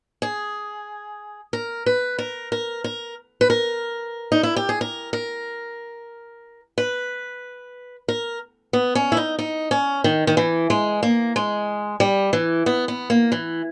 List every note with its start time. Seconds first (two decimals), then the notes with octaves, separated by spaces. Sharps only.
0.22 G#4
1.53 A#4
1.86 B4
2.19 A#4
2.52 A#4
2.84 A#4
3.41 B4
3.50 A#4
4.32 D#4
4.43 E4
4.56 G4
4.69 G#4
4.81 A#4
5.13 A#4
6.78 B4
8.08 A#4
8.73 B3
8.95 C#4
9.12 E4
9.17 D#4
9.39 D#4
9.71 C#4
10.04 D#3
10.27 D#3
10.37 E3
10.70 G#3
11.03 A#3
11.36 G#3
12.00 G3
12.33 E3
12.66 B3
12.88 B3
13.10 A#3
13.32 E3